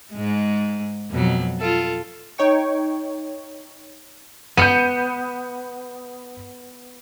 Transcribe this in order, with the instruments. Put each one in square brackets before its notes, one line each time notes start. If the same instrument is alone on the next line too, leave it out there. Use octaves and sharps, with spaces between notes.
[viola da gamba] G#2 G#3
F2 B2 F#3
F4 A4
[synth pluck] D#4 C#5 G5 C#6
[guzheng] B3 [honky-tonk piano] G6 C#7 D#7